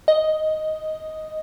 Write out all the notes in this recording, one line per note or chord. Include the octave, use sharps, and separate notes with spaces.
D#5